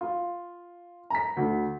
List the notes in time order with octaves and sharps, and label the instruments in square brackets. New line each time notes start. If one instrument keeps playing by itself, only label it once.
[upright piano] F4
A#5 B6
D2